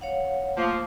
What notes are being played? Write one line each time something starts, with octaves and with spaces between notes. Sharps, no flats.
C#5 F5 F#5
F3 A3 A#3